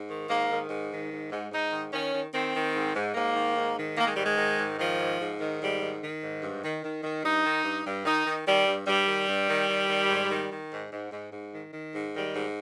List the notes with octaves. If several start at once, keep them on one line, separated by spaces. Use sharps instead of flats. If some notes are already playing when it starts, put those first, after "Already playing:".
Already playing: G#2
D#3
G#2 A#3
D#3
G#2
D#3
G#2
G#2
G#2 D#4
D#3
D#3 C#4
D#3
D#3 C4
D#3
G#2
G#2
G#2 A#3
D#3
G#2
D#3
D#3 A#3
G#3
G#2 G3
G#3
D#3
G#2
D#3 F3
G#2
G#2
D#3
G#2 G3
D#3
D#3
G#2
G2
D#3
D#3
D#3
G2 D#4
D#3
G2
G2
D#3 D#4
D#3
D#3 G3
G2
G2 G3
D#3
G2
D#3
D#3
D#3
G#2
D#3
D#3
G#2
G#2
G#2
G#2
D#3
D#3
G#2
D#3 G3
G#2